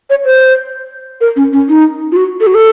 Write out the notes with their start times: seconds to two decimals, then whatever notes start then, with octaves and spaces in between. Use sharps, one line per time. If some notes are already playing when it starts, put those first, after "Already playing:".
0.10 C#5
0.25 C5
1.21 A#4
1.36 C#4
1.53 C#4
1.69 D#4
2.12 F4
2.16 F#4
2.40 A4
2.47 F#4
2.55 A4